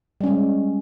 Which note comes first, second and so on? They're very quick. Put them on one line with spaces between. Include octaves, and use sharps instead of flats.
G3 C#4 G#3